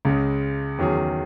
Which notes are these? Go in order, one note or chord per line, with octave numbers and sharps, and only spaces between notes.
C#2 C#3 G#3
E2 D#3 F#3 C#4 G#4